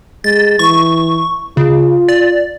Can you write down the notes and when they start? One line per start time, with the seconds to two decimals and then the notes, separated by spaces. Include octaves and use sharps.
0.24 G#3 A6
0.59 E3 C#6
1.57 C#3 F4
2.08 D5